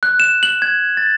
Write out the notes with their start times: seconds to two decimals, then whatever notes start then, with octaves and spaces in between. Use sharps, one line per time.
0.03 F#6
0.20 E7
0.43 F#7
0.62 G#6
0.97 A6